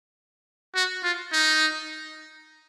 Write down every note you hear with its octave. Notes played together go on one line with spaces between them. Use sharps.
F#4
F4
D#4